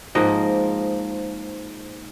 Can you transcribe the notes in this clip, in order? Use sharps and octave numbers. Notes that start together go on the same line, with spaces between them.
G#2 F3 A#3 D#5